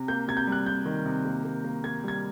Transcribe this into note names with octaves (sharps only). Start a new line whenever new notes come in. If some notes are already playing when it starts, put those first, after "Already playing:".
Already playing: C3
A#3 G6
C3 G#6
G6
G3
F#6
C3 G6
D#3
C3
A#3
A#3
A#3
A#3 G#6
G3 G#6